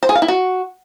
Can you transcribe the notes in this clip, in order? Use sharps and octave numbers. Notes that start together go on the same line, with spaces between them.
C5
G#4
F5
E4
F#4